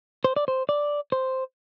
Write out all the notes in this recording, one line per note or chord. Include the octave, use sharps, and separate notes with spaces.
C5
D5
C5
D5
C5